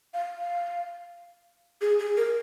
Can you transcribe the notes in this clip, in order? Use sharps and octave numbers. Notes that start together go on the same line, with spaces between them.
F5
F5
G#4
G#4
A#4